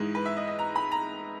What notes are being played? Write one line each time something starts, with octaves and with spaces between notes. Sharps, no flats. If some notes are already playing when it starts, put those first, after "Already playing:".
Already playing: G#2 E3 G#3
B4
E5
D#5
D#5
A#5
B5
A#5